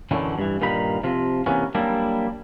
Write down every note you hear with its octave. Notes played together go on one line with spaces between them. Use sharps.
F#2 B2 D3 E3 F#3 A3
G2 E3
G2 A#2 D#3 D#4 B5
C3 F3 F4
C3 E3 A#3 B3 C#4
F#3 G3 A#3 D4 E4